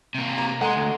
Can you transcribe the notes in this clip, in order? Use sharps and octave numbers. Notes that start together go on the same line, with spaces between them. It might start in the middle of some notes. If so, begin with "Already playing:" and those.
C3 A#3
A#5
G#3 A4 F#5 A#5 C6
D2